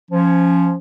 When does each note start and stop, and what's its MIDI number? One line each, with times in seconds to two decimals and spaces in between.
0.11 0.74 53
0.11 0.74 61